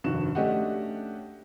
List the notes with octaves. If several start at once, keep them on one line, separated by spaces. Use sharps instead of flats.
F1 G2 D#3 F#4 E7
A3 C#4 D4 G4 D#5 F#5